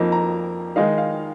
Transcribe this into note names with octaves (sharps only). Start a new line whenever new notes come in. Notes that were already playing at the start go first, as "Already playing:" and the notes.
Already playing: F2 F3 A#3 D#4
A#5
D#3 G#3 D#4 F5
F5